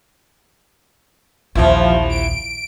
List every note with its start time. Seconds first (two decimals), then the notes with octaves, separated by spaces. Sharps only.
1.55 A#1 D#2 C3 E3 F3 E4
2.09 D7